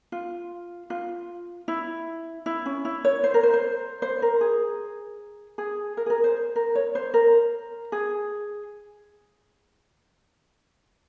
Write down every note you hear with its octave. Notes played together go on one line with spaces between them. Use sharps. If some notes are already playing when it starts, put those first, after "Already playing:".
F4
F4
E4
E4
C#4
E4
C#5
C5
A#4
C5
C5
C5
A#4
G#4
G#4
A#4
G#4
A#4
C5
A#4
C#5
C5
A#4
G#4